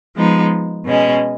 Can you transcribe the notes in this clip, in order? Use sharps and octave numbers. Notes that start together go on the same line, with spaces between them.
F3 G#3 B3 D#4
B2 G#3 C#4